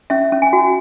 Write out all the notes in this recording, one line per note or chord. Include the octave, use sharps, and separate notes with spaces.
C#4 E5
C#4
G#5
F#4